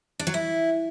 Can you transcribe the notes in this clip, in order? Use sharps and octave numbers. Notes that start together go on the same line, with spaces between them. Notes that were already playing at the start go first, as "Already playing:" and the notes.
D4
F#3
E4